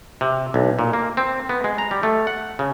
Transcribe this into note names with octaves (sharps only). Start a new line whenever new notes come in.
C3
B1
A#2
A#3
C4
B3
G#3
A#5
G3
A3
F#5
C#3